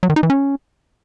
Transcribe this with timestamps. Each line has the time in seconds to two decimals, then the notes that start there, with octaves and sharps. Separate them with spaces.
0.03 F#3
0.10 D#3
0.16 D#4
0.23 E3
0.30 C#4